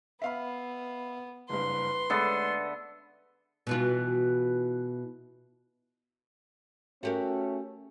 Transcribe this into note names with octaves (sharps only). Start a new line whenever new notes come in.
B3 E5 F5 B5
F#1 G2 B4 C6
D3 G#3 A3 B3 E5 A6
B2 E3 F4
A3 C#4 F#4 G4 A#4